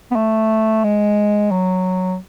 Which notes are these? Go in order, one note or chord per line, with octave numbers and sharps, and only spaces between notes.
B3
A3
G#3
F#3